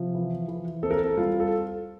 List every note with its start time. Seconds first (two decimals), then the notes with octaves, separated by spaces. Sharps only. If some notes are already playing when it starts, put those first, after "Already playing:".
Already playing: C3 F3
0.15 E3
0.48 E3
0.83 C4 A4
0.91 A#4
0.97 A4
1.17 G3 F4
1.40 A4